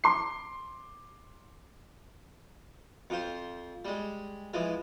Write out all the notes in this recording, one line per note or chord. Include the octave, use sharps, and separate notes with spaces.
C6 D6 C7
F2 F4 C5
G3 G#3
E3 F3 G#3